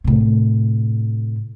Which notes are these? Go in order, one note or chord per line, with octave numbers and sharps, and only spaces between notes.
A2 C3